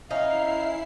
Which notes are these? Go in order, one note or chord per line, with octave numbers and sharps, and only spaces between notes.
C#4 D#4 E4 E5 F5 C7